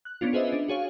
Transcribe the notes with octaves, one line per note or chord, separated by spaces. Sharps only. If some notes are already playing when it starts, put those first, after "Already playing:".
F#6
B3 C#4 D4 F4
F4 G#4 B4 C5 D#5 E5
D4
F#4 G#4 C#5 F5